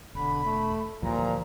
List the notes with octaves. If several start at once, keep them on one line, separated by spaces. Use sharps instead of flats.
E1 D3 B5
A3
D2 A#2 E3 F3 G3 A#5